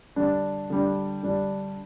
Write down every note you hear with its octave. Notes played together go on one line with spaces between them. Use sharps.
D3 G3 D4
D3 G3 D4
D3 G3 D4